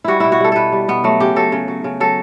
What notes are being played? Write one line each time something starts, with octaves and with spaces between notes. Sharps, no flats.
G3 E4 F#4
B2 E4
F#4
G3 A4
B2 A4 B4
G3
B2 B3
F#3 A3
C#3 G4
F#3 A4
C#3
F#3
C#3
F#3 A4